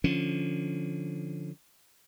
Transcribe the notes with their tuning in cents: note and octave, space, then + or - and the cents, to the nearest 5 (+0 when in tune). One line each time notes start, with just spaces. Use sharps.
D3 +0 F3 +0 C#4 +0